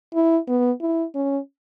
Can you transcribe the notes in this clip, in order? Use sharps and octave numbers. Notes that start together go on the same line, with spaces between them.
E4
B3
E4
C#4